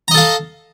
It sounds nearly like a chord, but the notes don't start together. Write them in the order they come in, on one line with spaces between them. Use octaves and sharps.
A#5 D#5 A4 F5